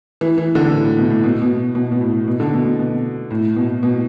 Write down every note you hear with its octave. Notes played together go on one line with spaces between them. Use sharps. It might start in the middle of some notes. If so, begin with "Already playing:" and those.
E3
E3
D3
A2
A2
B2
A2
B2
B2
B2
B2
A2
B2
D3
B2
B2
B2
A2
B2
B2